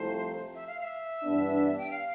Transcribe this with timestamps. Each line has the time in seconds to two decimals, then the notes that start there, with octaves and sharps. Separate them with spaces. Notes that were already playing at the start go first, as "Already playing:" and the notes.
Already playing: C2 C3 F3 A3 E4 C5
0.55 E5
0.67 F5
0.80 F5
0.84 E5
1.22 G2 E3 B3 D4
1.78 G5
1.91 F5